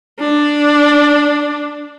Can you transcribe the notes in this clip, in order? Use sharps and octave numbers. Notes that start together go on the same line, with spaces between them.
D4